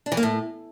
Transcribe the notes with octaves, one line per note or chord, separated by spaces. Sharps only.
D4
E3
A#3
A2